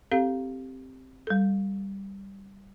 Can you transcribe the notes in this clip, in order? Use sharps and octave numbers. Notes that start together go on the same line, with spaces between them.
C4 G4 A4 F5
G3 A4